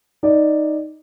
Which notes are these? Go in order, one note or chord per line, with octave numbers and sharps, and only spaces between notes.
D#4 D5